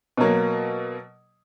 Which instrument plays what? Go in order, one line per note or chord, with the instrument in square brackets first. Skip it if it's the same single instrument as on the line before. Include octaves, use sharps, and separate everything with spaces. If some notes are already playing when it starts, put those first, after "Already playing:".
[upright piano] B2 F#3 A#3